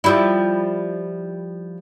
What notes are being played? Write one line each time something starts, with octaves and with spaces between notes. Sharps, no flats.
F3 G3 E4